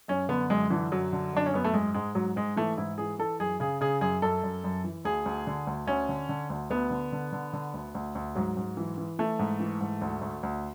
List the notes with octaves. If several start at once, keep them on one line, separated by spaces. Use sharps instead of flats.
F#2 C#4
D3 B3
F#2 G#3
D3 E3
F#2 F#3
D3
F#2 D4
C#4
F#2 B3
A3
G#2 G#3
G#2 G#3
G#2 F#3
G#2 G#3
E3 A3
G#2 E4
E3 G#4
E3 A4
F#2 G#4
C#3 G#4
C#3 G#4
F#2 G#4
F#2 A4
F#2
F#2
E3
D2 G#4
D2
D3
D2
D2 C#4
D3
D3
D2
D2 B3
D3
D3
D3
D3
D2
D2
D2
G#2 F#3
G#2
E3
E3
E3 A3
G#2
E3
G#2
D2
D2
D2